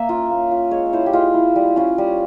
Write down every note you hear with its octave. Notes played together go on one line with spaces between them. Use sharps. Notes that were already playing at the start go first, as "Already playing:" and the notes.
Already playing: A#3 E5
C#4 F4
A#3
C#4 F4
G#3 C#5
E4 C5
G4
G#3 F4
E4
G3
C#4 F4
G3